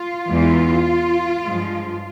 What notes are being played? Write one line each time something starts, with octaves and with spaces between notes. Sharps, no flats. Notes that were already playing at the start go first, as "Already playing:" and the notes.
Already playing: F4
E2 E3 G#3
G2 F3 G#3